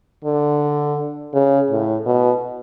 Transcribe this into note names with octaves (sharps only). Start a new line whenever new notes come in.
D3
C#3
A2
B2